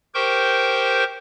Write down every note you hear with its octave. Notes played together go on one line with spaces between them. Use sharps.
G4 A#4 C5 G5 C#6 G6